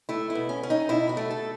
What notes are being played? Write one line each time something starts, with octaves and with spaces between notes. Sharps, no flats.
A3 E4
E4
B2
C#4
C#4
D#4
B2 E4
F#4
A3
A4